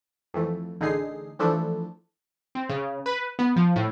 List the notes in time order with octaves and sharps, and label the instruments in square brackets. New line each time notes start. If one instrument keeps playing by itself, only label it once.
[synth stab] F2 E3 A3
A1 D3 D#4 G#4 C7
E3 F3 A3 D4 E4 A4
[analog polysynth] C4
C#3
B4
B3
F3
A2